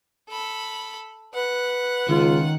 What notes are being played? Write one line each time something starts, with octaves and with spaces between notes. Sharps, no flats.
A4 B5
B4 F#5
C#2 D#3 F4